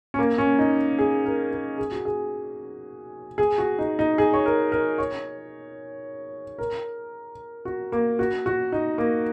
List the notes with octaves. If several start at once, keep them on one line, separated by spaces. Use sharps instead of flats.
C#4
A#3
C#4
D#4
G#4
A#4
A#4
G#4
F#4
G#4
G#4
F#4
D#4
D#4
G#4
C#5
A#4
A#4
C#5
A#4
F#4
A#3
F#4
F#4
D#4
A#3